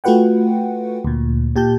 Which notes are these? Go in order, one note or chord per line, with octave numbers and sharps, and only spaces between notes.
A3 F4 F#4 B4 F#5 G5
D2 A#2
A#2 G4 A5 G6